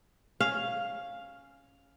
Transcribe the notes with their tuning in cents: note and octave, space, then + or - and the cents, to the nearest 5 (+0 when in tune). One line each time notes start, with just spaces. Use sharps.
C#4 +0 F5 +0